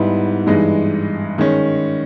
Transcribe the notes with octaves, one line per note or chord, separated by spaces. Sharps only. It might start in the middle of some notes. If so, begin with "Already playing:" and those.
Already playing: G#2 G3 B3 E4
G2 E3 G#3 D#4
D#3 G#3 C#4